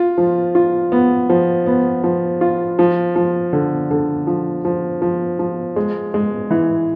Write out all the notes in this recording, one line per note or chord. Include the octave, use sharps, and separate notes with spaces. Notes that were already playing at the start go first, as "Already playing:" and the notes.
Already playing: F4
F3
F4
B3
F3
B3
F3
F4
F3
F3
D3
D3
F3
F3
F3
F3
G#3
G#3
E3